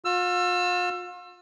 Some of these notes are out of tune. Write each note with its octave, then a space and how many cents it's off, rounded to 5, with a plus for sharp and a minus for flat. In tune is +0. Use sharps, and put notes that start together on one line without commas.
F4 +40 E6 +25